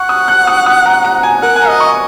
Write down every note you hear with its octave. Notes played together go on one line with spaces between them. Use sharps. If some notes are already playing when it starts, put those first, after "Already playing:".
Already playing: F#5 C#6
D#6
F#6
D#6
D#6
A#5
A#5
G#5
A#4 F#5
G#5
A#5
D#5
C#6